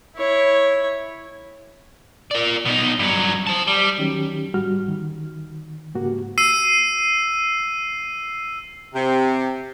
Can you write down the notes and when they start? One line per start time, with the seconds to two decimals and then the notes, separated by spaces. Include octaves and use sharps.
0.16 E4 C#5
2.31 A#4 D5
2.65 B2 D#4
2.99 G2 F#3
3.47 C5 A5
3.67 G3
3.98 D#3 F#3 C#4 G4
4.54 G#2 G3 F#4 F6
4.88 D#3
5.95 G#2 C#3 A#3 F#4 G4
6.38 E6 C7 D#7
8.94 C3